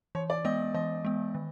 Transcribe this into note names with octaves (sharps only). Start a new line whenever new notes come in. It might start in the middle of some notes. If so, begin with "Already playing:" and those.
E3 C#5
D5
G#3 B3 D#5
E3 D#5
G#3 B3
D#3